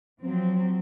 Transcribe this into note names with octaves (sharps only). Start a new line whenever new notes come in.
F3 F#3 C4